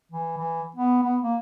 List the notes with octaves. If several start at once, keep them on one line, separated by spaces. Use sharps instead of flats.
E3
E3
B3
B3
A#3